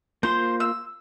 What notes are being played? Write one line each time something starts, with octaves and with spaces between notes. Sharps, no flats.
A#3 F4 C5 C6
E6